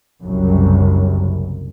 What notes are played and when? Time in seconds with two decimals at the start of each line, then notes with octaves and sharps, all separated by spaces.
0.21 F#1 C2 F#2